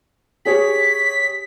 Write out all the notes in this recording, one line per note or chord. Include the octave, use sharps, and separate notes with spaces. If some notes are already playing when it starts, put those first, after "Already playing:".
G4 G#4 C#5 B6